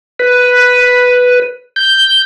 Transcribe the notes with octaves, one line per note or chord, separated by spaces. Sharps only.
B4
G6